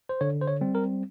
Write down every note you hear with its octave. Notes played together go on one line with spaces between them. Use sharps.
C5
D3 C#5
C5
C#5
G3 C4
A#4